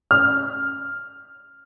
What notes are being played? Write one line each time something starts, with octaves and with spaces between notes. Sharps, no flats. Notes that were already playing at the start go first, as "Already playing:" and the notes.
F6